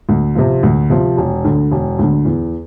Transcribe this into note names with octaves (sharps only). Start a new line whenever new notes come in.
D2
C3 F3
D2
C3 F3
E1
D2 D3
E1
D2 D3
E2